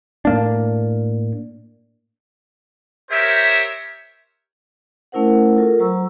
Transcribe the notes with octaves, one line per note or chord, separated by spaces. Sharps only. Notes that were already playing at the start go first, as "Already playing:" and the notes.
A2 A#3 D4
G4 A#4 C5 C#5 E5
A3 C#4 E4 A#4 C5 F#5
F4 A4 A#4
F#3 C5 A#5 C#6 E6